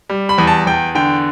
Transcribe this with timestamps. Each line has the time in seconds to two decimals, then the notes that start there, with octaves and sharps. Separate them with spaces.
0.09 G3
0.29 B5
0.38 E2
0.47 A5
0.66 E2 G5
0.95 D3 G5